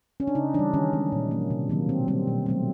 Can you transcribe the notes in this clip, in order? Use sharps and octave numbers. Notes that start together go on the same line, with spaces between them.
C#4
D4
C#3 D#4
E3 G3 D4
D#3 C#4
G#3 C4
A#2
F#3 A#3
C3
D#3 F#3 A#3
B2 C4
G3 C4
B2
F#3 A3 C4